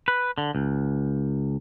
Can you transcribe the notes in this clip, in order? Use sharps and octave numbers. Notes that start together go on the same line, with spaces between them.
B4
D3
C#2